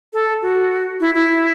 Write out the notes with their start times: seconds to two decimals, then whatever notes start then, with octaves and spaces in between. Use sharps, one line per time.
0.13 A4
0.42 F#4
1.00 E4
1.15 E4